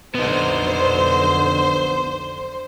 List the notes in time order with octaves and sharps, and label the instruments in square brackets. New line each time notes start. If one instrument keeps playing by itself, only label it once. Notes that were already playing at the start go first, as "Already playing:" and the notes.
[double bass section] B1 F2 D3 [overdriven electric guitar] B3 D#4 [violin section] C5